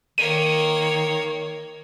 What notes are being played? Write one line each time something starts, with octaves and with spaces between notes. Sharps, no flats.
D#3 A#3 C#5 D#7